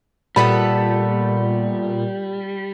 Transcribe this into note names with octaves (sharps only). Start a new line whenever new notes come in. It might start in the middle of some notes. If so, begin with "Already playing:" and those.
A#2 G3 A3 B3 A4 B5